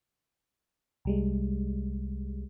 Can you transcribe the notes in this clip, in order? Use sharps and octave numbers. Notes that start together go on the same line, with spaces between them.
C2 G3 G#3